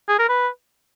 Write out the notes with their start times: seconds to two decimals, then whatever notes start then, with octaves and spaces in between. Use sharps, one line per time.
0.09 G#4
0.19 A#4
0.29 B4